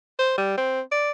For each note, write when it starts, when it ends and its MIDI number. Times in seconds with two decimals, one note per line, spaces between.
0.19 0.34 72
0.38 0.58 55
0.58 0.81 60
0.92 1.12 74